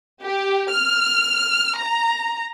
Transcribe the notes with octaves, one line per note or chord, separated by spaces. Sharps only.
G4
F6
A#5